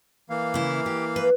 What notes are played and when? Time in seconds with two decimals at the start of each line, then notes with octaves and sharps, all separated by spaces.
0.30 E3 A#3 F5
0.54 C#3 E4
0.86 G4
1.16 B4